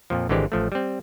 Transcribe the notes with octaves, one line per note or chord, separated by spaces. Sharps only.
F2 A#2 F3
G#1 D3 E3 G#3 C4 G4
A1 F3 A3
G3 C4